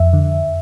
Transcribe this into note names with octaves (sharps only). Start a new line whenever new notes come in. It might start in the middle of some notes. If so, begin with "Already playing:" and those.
Already playing: F2 E5
D3